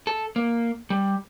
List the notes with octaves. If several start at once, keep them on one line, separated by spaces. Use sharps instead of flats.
A4
A#3
G3